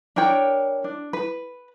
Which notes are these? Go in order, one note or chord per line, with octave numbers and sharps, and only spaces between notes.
D4 A#4 C#5 G5
D4
B4